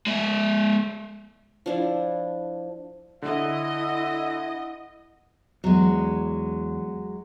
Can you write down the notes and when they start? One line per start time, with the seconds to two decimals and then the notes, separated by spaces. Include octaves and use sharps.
0.07 G#3 E5
1.66 F3 D4 E4
3.22 D3 E4 D#5 E5 F#5
5.64 E2 F#3 G#3